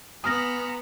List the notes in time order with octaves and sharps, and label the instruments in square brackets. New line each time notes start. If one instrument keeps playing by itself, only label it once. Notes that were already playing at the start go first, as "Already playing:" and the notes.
[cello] B3 [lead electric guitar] G#5 A#5 [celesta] D#6 F6 A#6